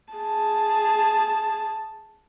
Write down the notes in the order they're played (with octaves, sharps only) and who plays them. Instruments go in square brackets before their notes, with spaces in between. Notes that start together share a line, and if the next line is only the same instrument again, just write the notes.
[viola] G#4 A5